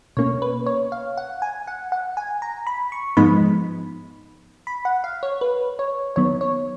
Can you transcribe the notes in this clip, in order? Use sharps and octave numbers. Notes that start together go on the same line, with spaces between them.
B2 A#3 C#4 C#5
B4
C#5
F5
F#5
G#5
F#5
F#5
G#5
A#5
B5
C#6
G#2 F3 G#3 B3 D#4 B5
B5
F#5
F5
C#5
B4
C#5
D#3 F#3 B3 C#5
C#5